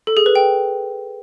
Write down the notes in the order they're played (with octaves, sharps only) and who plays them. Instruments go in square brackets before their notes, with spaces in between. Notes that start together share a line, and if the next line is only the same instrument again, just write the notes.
[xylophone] A4
G#4
B4
G5